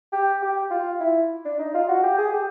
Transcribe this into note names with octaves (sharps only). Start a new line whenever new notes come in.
G4
G4
F4
E4
D4
D#4
F4
F#4
G4
G#4
G4